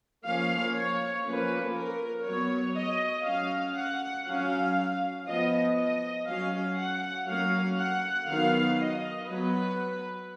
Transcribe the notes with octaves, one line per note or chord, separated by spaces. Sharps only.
F3 A#3 C#4 F5
C#5
F3 A#3 C#4 B4
A#4
F#3 B3 C#5
D#5
F#3 C#4 F5
F#5
F#3 C#4 F5
F3 B3 D#5
D#5
F#3 C#4 F5
F#5
F#3 A#3 C#4 F5
F#5
D#3 F#3 B3 F5
D#5
F#3 B3 B4